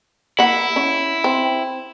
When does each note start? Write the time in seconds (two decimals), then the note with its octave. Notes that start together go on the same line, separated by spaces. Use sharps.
0.39 A#3 E4 F#5
0.76 C#4
1.24 C4